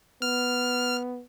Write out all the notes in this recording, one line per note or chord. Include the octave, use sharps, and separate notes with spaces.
B3 F6